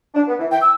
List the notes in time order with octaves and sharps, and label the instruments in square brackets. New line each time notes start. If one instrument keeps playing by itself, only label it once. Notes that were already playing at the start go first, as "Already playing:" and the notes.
[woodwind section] D4
B3
E3
[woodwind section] E3 [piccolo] G5
[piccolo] E6